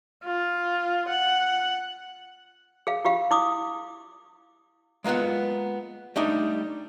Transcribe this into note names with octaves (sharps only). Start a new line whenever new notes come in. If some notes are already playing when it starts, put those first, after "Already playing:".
F4
F#5
G#4 F5
F4 G4 F5
E4 D6 D#6
G#3 A#3 B3 F4 F#5
G3 A3 D4 D#4